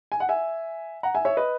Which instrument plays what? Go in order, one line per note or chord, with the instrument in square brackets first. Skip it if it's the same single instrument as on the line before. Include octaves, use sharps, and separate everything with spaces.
[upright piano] G#5
F#5
E5 G#5
F#5 A#5
E5 G#5
C#5 E5
B4 D#5